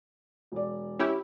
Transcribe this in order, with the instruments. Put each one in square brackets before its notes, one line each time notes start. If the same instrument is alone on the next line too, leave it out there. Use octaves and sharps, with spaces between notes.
[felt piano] E1 D5
[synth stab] C#4 E4 G4